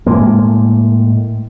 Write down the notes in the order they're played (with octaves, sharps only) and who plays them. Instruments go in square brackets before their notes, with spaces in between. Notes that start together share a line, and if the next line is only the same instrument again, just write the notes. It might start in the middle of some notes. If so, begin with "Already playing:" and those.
[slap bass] A2 G#3 A#3